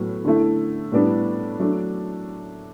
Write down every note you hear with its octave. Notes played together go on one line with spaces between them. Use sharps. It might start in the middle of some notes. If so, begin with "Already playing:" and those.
Already playing: A2 F#3 B3
D3 A3 E4
A2 G3 B3 D4
F#3 A3 D4